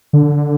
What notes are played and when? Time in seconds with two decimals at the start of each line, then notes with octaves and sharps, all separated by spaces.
0.13 D3